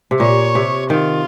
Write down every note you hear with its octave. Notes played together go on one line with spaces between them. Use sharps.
C3
A#2 C#5
C3
D#3 F4